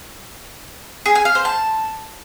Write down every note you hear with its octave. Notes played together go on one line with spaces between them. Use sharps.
G#4
G#5
F5
C5
A5